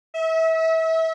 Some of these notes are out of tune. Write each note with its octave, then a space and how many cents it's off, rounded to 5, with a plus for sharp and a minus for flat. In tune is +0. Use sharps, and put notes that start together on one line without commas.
E5 -30